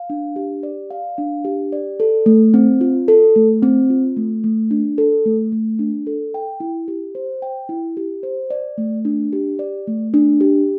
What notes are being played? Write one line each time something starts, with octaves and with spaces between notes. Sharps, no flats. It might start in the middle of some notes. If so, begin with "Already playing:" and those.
Already playing: F5
D4
G4
D5
F5
D4
G4
D5
A4
A3
C4
F4
A4
A3
C4
F4
A3
A3
D4
A4
A3
A3
D4
A4
G5
E4
G4
C5
G5
E4
G4
C5
D5
A3
D4
G4
D5
A3
D4
G4